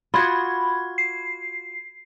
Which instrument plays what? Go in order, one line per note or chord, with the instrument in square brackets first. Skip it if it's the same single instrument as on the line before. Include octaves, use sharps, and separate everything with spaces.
[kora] F4 F#4 F#5 [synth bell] B5 G#6
[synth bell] C7